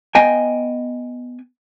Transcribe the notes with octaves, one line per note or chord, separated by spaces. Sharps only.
B3 D#5 G5 G#5